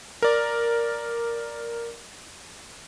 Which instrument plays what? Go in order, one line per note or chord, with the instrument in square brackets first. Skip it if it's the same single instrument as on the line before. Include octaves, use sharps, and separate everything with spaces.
[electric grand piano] A#4 D5